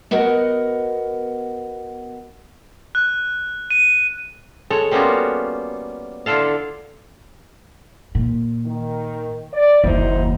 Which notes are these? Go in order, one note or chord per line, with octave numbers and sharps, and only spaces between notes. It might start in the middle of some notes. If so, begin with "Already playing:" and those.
B3 F#4 A#4 D#5 F#5
F#6
D#7
G#3 A4 C#5
G3 A#3 B3 C#4 F4 F#4
D3 E4 F4 A4 F5
A#2
D#3
D5
F#1 D#2 D#4 E4 C5